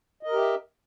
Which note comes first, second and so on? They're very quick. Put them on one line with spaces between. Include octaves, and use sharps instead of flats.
D#5 A#4 G4 E5